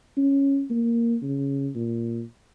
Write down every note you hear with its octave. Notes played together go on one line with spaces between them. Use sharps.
C#4
A#3
C#3
A#2